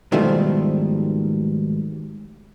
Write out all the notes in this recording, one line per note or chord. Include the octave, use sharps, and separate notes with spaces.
G#2 B2 D#3 F3 G3 A3